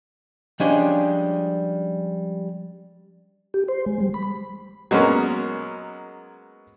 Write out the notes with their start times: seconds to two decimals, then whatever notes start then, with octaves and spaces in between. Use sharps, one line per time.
0.60 F3 G3 G#3 C#4 D4
3.54 G4
3.68 C5
3.86 G#3
4.00 G3
4.14 B5
4.91 F#3 G#3 A#3 B3 C#4